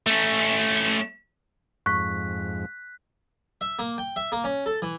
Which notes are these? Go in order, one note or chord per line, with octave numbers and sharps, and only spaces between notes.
A3 C#4
F2 G#2 C#6 F#6 B6
E5
A#3
G5
E5
A#3
C#4
A4
E3